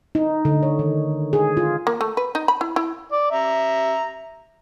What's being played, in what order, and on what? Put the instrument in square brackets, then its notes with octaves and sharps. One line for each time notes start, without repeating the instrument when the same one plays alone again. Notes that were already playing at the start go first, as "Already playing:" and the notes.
[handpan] D#4
D3
C#5
D#3
G#4
F4
[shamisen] A#3
A3
B4
D#4
B5
E4
E4
[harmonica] D5
E5 A#5